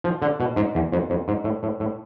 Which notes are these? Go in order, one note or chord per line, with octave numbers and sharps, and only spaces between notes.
F3
D3
B2
G#2
E2
F2
F2
G#2
A2
A2
A2